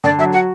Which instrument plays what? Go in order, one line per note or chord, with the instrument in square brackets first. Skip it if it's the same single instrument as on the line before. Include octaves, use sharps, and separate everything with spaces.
[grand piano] D3 [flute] D5
[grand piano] F#3 [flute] E5
[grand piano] F#4 [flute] F#5